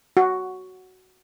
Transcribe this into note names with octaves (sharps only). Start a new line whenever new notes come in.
F#4